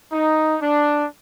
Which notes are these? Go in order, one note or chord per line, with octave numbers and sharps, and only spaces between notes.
D#4
D4